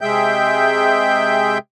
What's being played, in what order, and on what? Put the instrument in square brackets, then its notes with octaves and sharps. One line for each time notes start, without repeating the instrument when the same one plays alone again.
[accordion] C3 G#3 G#4 E5 G5 G6